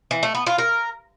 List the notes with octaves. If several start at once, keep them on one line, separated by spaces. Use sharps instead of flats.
E3
A3
B3
F4
A#4